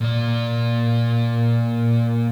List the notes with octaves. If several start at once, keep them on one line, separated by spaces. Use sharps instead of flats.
A#2 D5